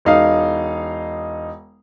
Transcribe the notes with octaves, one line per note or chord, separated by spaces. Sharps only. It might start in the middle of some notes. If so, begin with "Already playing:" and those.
E1 D#4 F5